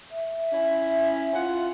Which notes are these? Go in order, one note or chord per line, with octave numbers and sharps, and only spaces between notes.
E5
C#4 E4
F4 F#5